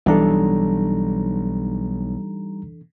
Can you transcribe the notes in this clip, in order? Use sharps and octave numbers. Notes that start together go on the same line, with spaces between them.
B1 E3 G3 D4 D#4 A4 A#5